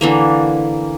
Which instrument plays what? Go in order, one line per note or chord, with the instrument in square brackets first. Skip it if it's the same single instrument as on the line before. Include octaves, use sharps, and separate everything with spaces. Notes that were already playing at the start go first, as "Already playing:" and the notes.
[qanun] D3 E3 A#3